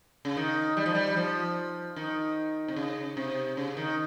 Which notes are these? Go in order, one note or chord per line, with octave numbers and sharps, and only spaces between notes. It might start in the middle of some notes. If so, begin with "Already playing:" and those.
C#3
D#3
G3
F3
G3
F3
D#3
C3
C#3
C3
C#3
D#3